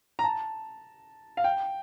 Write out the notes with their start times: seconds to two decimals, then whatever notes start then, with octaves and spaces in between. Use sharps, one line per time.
0.19 A#5
0.24 A5
1.37 F5
1.44 G5